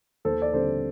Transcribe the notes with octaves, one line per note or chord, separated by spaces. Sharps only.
D#2 A4 C5
D5
D3 G3 C4 A4 C5